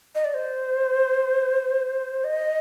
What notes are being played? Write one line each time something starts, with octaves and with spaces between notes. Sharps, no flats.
D#5
D5
C5
D#5